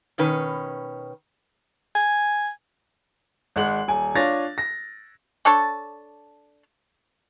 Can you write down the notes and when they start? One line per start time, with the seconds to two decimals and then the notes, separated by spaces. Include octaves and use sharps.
0.18 B2 D#3 C#4 B4
1.95 G#5
3.56 G#1 G#3 F#5 F#7
3.88 D#1 G#5
4.15 D4 F4 C#5 A6 A#6
4.58 A#6
5.45 D4 A4 C#5 A5